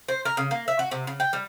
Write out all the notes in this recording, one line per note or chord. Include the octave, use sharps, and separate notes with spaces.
C5
A#4
C#3
A#3
E5
F#4
C3
C#3
G5
G3